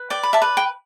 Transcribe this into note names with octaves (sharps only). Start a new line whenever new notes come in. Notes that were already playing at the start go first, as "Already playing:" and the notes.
Already playing: B4
D5 G5
B5
E5 A5
B4
G5